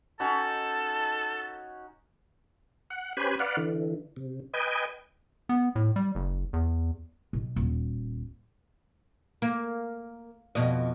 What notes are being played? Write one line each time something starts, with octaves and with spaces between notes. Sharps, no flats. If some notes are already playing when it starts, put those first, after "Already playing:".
C#4 D#4 F#4 A4 A5
F#5
C#4 G4 B4 C5 G#5 B5
B4 D5 F5 F#5
D3 E3
C3
B4 D#5 G5 G#5
B3
A2
G3
F#1
E2
B1
D#1
A#3
F2 B2 D#5